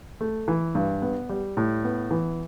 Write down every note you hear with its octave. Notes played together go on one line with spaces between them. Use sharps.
A3
E3
G2
B3
G3
A2
B3
E3